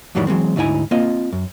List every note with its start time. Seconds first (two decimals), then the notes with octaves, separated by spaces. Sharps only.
0.15 F2 A2 D#3 E3 F#3 G3
0.27 E3 F#3 G#3 C4
0.56 D2 G#2 D#4 E4 G#5
0.91 A#3 C4 F4 D#5
1.32 F#2